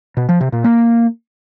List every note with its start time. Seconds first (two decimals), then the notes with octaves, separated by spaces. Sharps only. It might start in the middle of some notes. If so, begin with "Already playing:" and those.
0.17 B2
0.29 F3
0.41 C3
0.52 A#2
0.64 A#3